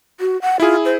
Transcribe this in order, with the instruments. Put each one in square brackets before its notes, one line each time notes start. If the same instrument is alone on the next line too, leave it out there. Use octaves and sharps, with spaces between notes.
[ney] F#4
F#5
[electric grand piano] E4 G#4 [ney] F4
[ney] C5